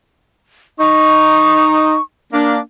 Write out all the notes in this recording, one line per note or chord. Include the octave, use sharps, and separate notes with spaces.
D#4 C#6
A#3 D4